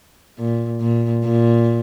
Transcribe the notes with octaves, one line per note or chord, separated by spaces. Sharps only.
A#2
A#2
A#2